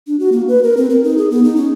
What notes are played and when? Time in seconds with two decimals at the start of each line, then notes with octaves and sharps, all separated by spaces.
0.07 D4
0.20 F#4
0.32 A#3
0.48 B4
0.63 A#4
0.77 C4
0.90 A#4
1.04 D#4
1.18 G#4
1.31 B3
1.44 D#4
1.56 C#4